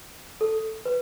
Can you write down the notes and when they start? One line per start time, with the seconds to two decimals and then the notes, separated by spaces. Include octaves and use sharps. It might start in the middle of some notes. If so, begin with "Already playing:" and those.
0.41 A4
0.85 B4